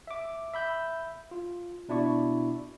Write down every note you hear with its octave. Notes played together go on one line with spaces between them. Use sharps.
E5 D6
E5 B5 G6
F4
B2 D4 E4 D5 C#6